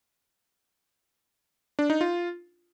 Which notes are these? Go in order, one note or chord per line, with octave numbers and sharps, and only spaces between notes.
D4
D#4
F4